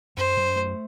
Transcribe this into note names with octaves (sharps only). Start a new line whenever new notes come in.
F#2 C5
F#2
A3